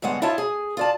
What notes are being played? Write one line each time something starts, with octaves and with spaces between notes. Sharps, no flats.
G2 C#3 G#3 B3 F#5
E4 F4 C#5 D#5 A5
G#4
F4 D5 A5